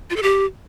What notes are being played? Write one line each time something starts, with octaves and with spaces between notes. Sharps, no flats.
F4
A4
G4